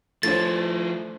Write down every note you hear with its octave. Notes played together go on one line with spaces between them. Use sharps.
F3 A3 D4 E4 C5 A6